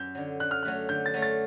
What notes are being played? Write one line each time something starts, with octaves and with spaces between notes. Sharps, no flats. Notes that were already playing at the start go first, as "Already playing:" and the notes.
Already playing: F#2 G6
D3 F#3
D3 F#6
F6
F#3 A3 F#6
D3 G6
A6
F#3 A3
A6